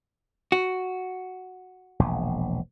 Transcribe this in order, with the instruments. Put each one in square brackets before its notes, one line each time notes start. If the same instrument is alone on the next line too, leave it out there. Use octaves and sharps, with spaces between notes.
[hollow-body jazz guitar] F#4
[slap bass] E1 A#1